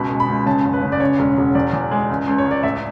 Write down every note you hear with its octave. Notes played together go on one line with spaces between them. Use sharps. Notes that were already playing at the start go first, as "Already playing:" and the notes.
Already playing: C#2 B2 B5
G#3
B5
C#2
C#3 A5
F#1
B4
C#3
D5
C#3 C#5
E1
E1
E2 D5
E2
G#3
C#2
C#2
C#5
C#2 D5
A1 E5